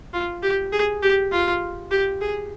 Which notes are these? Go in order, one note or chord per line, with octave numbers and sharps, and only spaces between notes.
F4
G4
G#4
G4
F4
G4
G#4